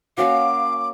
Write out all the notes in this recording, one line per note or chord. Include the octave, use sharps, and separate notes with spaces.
A#3 C#4 F#4 F5 D6